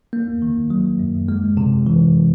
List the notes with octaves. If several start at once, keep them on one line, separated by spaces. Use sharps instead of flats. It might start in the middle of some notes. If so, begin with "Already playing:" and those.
A#3
D#3
F#3
F#2
G#3
C3
E3